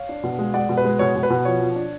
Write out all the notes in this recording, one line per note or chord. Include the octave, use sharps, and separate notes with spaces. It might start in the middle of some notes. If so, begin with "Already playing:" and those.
Already playing: C#5 F5
D4
B2
G#3
G#3 D5 F#5
B2
B4
G#3
B2 C#5
B2
B4
B2
F3 C#5
F3
D4